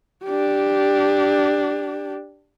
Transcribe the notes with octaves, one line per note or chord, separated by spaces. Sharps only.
D4 G4